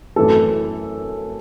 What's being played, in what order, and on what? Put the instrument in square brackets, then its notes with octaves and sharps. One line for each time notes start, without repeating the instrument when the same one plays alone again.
[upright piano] F#2 E3 A3 A4